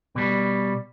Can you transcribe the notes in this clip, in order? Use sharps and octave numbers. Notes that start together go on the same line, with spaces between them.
B2 G3